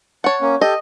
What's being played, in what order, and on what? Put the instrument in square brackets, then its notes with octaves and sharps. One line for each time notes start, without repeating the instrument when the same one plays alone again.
[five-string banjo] C#5 F#5 [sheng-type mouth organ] A5
[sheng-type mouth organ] A#3 C#4
[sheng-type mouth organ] G4 A4 G6 [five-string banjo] D#5